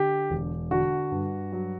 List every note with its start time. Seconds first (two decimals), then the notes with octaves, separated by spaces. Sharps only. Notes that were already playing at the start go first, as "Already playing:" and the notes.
Already playing: D3 G4
0.30 E1
0.71 D3 F#4
1.11 G2
1.52 F#3